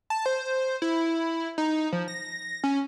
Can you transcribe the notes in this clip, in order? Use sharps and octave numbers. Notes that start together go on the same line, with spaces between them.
A5
C5
E4
D#4
F3
A#6
C#4